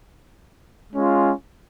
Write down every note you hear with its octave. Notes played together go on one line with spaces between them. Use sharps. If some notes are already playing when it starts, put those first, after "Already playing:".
G#3 C#4 F4